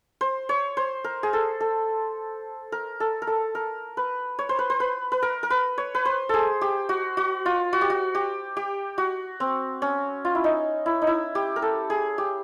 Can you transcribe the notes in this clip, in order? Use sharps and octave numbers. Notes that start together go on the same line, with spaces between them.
C5
C#5
C5
A#4
G#4
A4
A4
A#4
A4
A#4
A4
A#4
B4
C#5
C5
B4
C5
B4
B4
A#4
A#4
B4
C#5
B4
C5
G#4 A4
G4
F#4
F#4
F4
F#4
G4
F#4
G4
G4
F#4
C4
C#4
F4
E4
D#4
E4
D#4
E4
G4
A#4
A4
G#4
G4